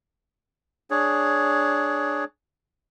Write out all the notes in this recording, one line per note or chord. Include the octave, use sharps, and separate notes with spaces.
D4 G#4 C#5